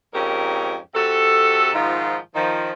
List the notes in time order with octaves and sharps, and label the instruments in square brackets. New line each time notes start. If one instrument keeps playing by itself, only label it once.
[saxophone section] F2 G#2 C#4 G4 A#4
C3 F#4 A4
G#2 D#3 F3 F4
D#3 F3